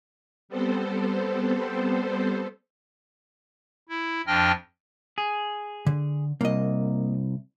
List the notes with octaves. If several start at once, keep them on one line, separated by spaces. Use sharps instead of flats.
G3 B3 C4 A4 C5
E4
F2 F3 D4 D#5 G5 F6
G#4
D3
C2 A#3 D#5